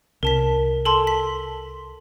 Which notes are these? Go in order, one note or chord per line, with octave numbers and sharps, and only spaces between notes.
C2 A#4 A5 B6
A4 A5 C6
B6